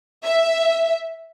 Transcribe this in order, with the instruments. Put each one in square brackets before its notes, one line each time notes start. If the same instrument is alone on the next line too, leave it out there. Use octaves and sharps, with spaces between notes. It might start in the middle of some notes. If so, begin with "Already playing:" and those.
[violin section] E5